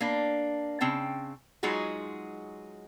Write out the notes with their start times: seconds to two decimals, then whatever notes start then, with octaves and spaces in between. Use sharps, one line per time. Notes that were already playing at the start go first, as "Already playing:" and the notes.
0.01 A#3 D4
0.81 C#3 C4 G5 A5
1.63 F#3 G#3 D#4 F4 F#4 G#4